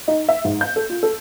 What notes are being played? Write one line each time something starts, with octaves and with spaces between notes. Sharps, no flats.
D#4
E5
G#2
G6
A4
F4
A4